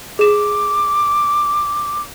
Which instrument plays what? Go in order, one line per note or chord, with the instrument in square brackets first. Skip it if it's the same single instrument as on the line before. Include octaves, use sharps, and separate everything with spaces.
[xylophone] G#4 E7 [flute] D6